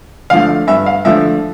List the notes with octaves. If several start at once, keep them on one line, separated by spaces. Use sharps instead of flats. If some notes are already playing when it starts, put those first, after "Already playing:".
D3 F3 A3 F5
G2 E5
F5
D3 F3 A3 E5